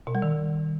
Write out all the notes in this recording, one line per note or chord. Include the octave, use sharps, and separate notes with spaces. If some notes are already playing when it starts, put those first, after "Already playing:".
B2
G3
D#3